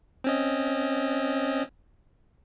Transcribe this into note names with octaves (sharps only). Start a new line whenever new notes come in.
C4 C#4 D#5